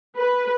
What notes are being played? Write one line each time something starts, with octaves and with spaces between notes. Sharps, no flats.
B4